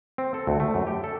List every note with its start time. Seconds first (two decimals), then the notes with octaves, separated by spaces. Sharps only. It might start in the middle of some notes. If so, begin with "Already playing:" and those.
0.18 C4
0.34 A4
0.47 D2
0.60 A3
0.75 F#2
0.87 G4
1.04 A4